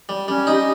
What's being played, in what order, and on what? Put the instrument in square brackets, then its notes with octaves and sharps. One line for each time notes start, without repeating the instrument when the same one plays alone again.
[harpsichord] G3
[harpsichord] G3 [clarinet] C#4
[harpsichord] D#4
[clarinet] G4